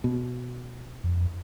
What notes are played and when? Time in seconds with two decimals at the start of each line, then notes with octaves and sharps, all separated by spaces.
0.04 B2
1.04 F2